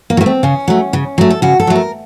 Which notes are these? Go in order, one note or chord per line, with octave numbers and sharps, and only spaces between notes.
A#3
F#3
A3 A#3
C4
C#3 C#4
F#3 A3
C#3
F#3 A3
A4
C#3 F#4
A4
F#3 A3
A#4